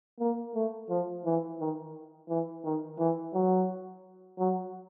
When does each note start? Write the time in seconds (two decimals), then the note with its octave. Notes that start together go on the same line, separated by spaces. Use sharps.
0.20 A#3
0.55 A3
0.90 F3
1.25 E3
1.60 D#3
2.29 E3
2.64 D#3
2.98 E3
3.34 F#3
4.38 F#3